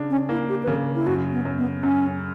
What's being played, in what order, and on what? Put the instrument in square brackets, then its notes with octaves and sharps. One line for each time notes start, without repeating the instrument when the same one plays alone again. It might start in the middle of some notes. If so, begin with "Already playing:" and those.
Already playing: [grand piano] C#3 D4
[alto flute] C#4
[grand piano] A#3 [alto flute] E4
[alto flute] G4
B4
[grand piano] C#3 [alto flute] A#4
[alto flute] E4
[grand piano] F#2 [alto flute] F#4
[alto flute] B3
[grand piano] F#2
[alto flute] B3
[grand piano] F#2 [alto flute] C#4